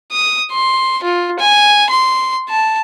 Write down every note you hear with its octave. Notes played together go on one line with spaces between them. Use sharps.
D#6
C6
F4
G#5
C6
A5